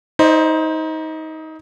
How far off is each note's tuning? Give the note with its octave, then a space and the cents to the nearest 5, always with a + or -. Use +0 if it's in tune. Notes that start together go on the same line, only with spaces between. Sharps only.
D#4 +25 C5 +0 D#5 -45